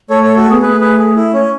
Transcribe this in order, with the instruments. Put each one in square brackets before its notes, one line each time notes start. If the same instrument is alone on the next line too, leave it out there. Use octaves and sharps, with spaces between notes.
[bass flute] A3 [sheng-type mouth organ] A4 C#5
[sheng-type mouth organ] A4 C#5
F#4 A4
[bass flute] B3 [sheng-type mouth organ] G#4
[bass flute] A3 [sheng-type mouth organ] G#4 B4
[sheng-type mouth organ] G#4 B4
G#4
E4
C#4